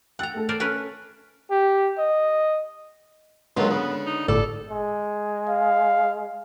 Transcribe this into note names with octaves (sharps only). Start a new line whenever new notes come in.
F#5 G5 A#5 E6 A6
A3 A4
A#4 C5 D5
C#4 A#4 B4
G4
D#5
C#2 A#2 D3 F#3 F4 B4
C#3 B3
D#4
G1 A2 A4 D5 E6
G#3
F5